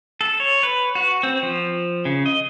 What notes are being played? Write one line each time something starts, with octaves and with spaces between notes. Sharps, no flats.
A4
C#5
B4
F#4
C4
F3
C#3
D#5